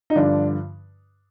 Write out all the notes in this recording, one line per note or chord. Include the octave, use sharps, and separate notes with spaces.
D#4
G2 D3 F3 D4